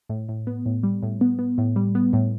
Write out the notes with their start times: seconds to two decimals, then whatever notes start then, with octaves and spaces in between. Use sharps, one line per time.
0.09 A2
0.29 A2
0.47 B3
0.66 A2
0.83 G3
1.03 A2
1.21 B3
1.39 B3
1.58 A2
1.76 G3
1.95 B3
2.13 A2